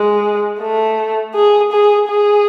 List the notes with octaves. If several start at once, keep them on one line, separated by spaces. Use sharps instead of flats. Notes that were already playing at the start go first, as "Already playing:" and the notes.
Already playing: G#3
A3
G#4
G#4
G#4